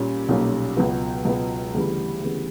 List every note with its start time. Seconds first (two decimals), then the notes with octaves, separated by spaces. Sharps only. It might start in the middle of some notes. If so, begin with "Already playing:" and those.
Already playing: A#2 G3 A#3 C#4
0.28 B1 A#2 G3 A#3 C#4
0.77 C#2 B2 F#3 B3
1.25 C#2 B2 F#3 B3
1.74 D2 C#3 E3 G3 B3
2.23 D2 C#3 E3 G3 B3